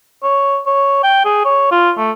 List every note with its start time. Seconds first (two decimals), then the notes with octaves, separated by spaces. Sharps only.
0.23 C#5
0.66 C#5
1.03 G5
1.25 G#4
1.45 C#5
1.71 F4
1.97 A3